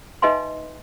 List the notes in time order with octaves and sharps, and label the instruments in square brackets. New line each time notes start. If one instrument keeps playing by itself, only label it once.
[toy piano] D#4 B4 D#5 E5 G#5 C6